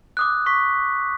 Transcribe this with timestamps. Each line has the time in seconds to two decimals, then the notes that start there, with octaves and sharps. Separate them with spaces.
0.17 D6 D#6 F#6
0.46 C#6 B6